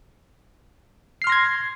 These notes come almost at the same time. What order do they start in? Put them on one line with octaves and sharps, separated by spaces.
C7 F6 C6 A#6 G#6